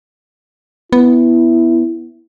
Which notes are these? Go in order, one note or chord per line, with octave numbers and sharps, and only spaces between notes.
B3 E4